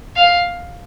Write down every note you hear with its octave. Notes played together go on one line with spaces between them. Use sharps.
F5